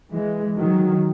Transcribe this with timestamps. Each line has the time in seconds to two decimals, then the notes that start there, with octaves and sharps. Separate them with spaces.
0.10 E3 G#3
0.58 D#3 F#3